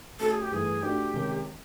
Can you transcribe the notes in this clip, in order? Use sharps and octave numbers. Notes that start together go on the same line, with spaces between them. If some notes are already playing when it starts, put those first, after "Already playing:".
A3 C#4 F#4 A4
G#4
G4
G2 E3 A3 G#4
A3 D4 F#4 G4
C3 D#3 G#3 C#4